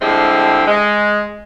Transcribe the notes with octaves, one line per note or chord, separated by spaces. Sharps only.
D3 F3 G3 G#3 C4 E4
G#3